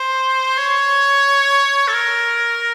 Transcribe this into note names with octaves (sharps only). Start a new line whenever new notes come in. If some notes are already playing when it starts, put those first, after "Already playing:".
Already playing: C5
C#5
A4
A#4